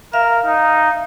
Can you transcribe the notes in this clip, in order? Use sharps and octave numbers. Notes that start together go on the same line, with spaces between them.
A#4 E5 F5
D#4